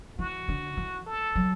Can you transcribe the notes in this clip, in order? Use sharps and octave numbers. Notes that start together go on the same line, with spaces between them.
E3 F#4
D3
E3
A4
F#3